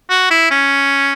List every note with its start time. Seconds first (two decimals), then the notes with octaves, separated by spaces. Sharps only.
0.10 F#4
0.30 E4
0.51 C#4